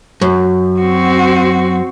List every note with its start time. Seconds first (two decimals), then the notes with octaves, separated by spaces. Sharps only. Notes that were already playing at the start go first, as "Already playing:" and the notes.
0.21 F#2
0.80 C4 F#4